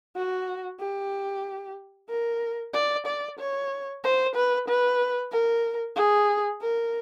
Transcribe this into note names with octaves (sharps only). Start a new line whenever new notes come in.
F#4
G4
A#4
D5
D5
C#5
C5
B4
B4
A#4
G#4
A#4